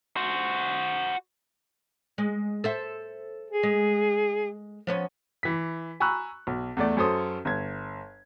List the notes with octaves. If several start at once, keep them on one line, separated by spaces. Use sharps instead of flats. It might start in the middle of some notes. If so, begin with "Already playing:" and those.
F#4 C5
G#3
A4 C5 E5
G#4
G#3
F3 B3 C#4
E3 B6
G#5 A#5 B5 C#6 E6 F#6
B1
E2 A3 D5
F#2 C#4 A4 C5 D#6
G1 G#6